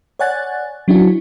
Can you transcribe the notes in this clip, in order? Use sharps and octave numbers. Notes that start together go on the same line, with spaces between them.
C#5 D5 F#5 G#5 F#6 A6
F#3 C#4 D4 E4 F#4